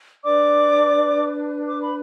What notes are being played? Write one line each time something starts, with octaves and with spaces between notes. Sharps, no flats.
D4 B4 D5 D6
D6
B5